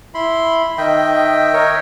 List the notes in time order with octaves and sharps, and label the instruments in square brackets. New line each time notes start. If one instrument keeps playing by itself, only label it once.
[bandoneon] E4 B5 C6
[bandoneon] D#3 [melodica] D#5 E5 G5
[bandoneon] A#4 C#5